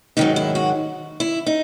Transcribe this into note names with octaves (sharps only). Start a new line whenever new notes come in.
G#2 D#3 F#3 D#4
E4
F#4
E4
D#4